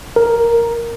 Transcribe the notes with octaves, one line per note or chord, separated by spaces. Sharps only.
A#4